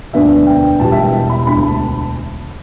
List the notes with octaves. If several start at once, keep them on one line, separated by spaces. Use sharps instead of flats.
E1 D2 D3 B3 D4 E5
G5
E1 E2 B2 G3 A5
E5
G5
E5
B5
E1 D2 D3 B5
A5